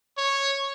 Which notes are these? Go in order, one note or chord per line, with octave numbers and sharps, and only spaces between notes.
C#5